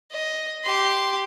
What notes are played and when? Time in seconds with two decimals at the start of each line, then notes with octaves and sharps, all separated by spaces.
0.12 D#5
0.64 G4 C6